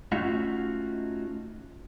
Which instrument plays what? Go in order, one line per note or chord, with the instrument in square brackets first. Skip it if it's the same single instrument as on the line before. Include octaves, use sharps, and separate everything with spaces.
[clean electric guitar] A3 C#4 D#4 F4 F#4